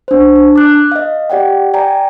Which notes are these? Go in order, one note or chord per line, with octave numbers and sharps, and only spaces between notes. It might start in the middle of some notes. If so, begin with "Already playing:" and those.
D4 C5
D4
D6 F#6
D#5 F5
G4 D5 F#5 G5
D5 G5 G#5 A#5